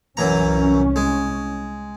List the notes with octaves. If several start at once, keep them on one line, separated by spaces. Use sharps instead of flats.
C2 F#2 E3 C#4 A#5
G#3